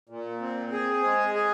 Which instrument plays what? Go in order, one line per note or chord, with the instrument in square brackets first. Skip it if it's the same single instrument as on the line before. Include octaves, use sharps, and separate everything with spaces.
[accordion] A#2
C4
G#4
G#3
G#4